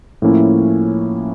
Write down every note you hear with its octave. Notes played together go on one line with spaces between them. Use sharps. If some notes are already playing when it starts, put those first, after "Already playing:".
A2 F3 A#3 C#4 E4